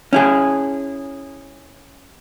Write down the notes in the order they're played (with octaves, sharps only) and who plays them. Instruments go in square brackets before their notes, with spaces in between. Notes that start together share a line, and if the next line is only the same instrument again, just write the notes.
[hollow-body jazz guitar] C#4 E4 G#4